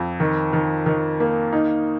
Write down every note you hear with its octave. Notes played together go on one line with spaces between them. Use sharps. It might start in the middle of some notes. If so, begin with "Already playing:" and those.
Already playing: F2
D#3
D#3
D#3
A#3
D#4